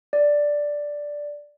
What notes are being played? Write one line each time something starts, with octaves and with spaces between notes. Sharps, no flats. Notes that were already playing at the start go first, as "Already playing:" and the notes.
D5